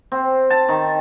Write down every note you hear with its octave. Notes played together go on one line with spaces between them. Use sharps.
C4
A5
D#3